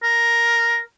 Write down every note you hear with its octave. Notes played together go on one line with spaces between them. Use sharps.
A#4